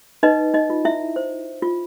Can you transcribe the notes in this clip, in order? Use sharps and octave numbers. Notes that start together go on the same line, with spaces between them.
D#4 B4 D#5
D#4 D#5
F4
E4 E5
C5
F4